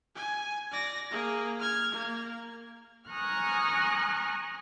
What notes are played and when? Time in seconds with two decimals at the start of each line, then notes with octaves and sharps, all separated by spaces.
0.16 G#5
0.72 D5 A#6
1.11 A#3 G#4
1.59 F6 G#6
1.92 A#3
3.11 G#5 A#5 C#6 D#6 F6 F#6